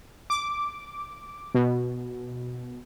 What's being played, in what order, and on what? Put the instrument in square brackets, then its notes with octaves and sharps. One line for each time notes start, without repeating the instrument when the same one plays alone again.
[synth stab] D6
B2